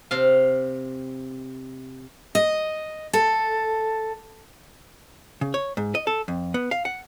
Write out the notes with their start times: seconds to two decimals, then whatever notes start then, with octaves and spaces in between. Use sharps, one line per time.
0.11 C3 F5
2.35 D#5
3.13 A4
5.41 C#3
5.54 C#5
5.77 G#2
5.95 D#5
6.07 A4
6.28 F2
6.54 B3
6.71 F5
6.85 F#5